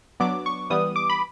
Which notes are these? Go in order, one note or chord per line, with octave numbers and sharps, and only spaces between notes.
F#3 B3 D4 D6
C#6
E3 G3 B3 D#6
D6
B5